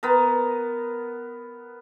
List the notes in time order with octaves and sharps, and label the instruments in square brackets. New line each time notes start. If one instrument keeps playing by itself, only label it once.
[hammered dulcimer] B3 A#4